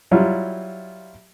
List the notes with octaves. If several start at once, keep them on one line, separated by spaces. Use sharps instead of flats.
F#3 G3 E4 F4